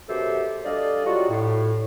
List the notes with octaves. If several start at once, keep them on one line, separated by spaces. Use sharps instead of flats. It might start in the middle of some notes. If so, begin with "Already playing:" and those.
F#2 B2 G4 A4 C5 E5
G3 D4 A4 D5 D#5 F5
F#3 G3 F4 F#4
A2